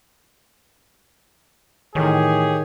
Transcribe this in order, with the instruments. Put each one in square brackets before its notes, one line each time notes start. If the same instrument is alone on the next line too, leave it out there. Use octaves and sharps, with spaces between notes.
[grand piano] A2 E3 [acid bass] D#3 [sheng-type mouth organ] G4 C#5 [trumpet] G#4